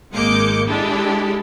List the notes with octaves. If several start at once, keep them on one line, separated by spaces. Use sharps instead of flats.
G#1 G#3 A#3 D6 G6 C#7
G#3 D4 E4 G4 A4